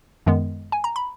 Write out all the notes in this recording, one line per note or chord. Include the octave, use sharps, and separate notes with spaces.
F#2 D#3 G#3 B3
G#5
A#5
B5